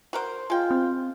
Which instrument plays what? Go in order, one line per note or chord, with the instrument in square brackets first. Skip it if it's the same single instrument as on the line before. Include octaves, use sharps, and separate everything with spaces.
[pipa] F#4 A#4 C5
[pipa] G#3 G5 [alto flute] F4
[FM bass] C4